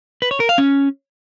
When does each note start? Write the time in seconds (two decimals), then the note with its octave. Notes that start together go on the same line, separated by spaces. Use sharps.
0.22 B4
0.31 C#5
0.40 A#4
0.49 F5
0.58 C#4